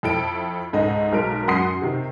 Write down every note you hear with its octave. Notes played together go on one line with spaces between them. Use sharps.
F2 E4 A4 G5 D7
C#2 G#2 A4 D#5 A#5
B1 G#3 A#4 D7
F#2 F#5 C6 D#6 C7
C3 D#3